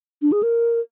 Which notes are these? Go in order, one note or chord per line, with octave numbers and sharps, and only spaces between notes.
D4
G#4
A#4